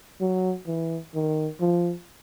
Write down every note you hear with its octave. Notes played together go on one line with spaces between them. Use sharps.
F#3
E3
D#3
F3